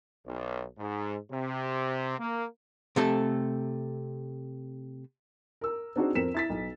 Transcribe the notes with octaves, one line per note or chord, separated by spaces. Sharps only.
B1
G#2
C3
A#3
C3 A3 A4
A#4 E6
C4 D4 D#4 F#4 G#4 C5
F2 C4 A#4 B6 E7
E4 A6 B6
B1